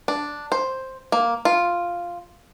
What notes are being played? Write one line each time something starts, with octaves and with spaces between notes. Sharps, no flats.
D4
C5
A#3
F4